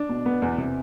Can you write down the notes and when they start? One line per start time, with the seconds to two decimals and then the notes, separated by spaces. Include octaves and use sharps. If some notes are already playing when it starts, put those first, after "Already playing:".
Already playing: D4
0.09 B2
0.26 B3
0.42 E2
0.58 C3